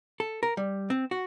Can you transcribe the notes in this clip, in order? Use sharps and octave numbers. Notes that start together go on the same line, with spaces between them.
A4
A#4
G3
C4
F#4